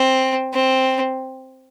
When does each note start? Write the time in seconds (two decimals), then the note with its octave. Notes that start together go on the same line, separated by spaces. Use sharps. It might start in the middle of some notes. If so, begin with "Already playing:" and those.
Already playing: C4
0.53 C4